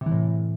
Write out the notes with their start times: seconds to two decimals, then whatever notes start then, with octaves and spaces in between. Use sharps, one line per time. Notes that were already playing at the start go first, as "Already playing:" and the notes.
0.01 C3
0.06 E3
0.11 A2